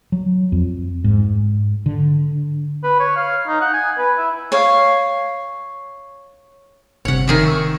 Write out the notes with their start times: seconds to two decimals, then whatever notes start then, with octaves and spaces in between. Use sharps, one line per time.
0.12 F#3
0.52 F2
1.04 G#2
1.86 D3
2.83 B4
3.00 C#5
3.16 F5
3.47 D#4
3.61 F#5
3.74 G#5
3.98 B4
4.17 E4
4.52 C#5 F5
7.05 G1 C3 C#5 F#5
7.28 D#3 G#4 E5
7.45 C#6 E6